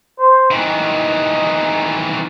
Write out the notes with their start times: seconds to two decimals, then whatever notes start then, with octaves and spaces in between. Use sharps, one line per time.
0.19 C5
0.51 D#3 E3 D#5